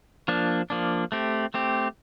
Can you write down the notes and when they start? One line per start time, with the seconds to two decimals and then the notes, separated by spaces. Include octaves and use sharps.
0.28 F3 A#3 D4
0.70 F3 A#3 D4
1.12 A3 C4 G4
1.54 A3 C4 G4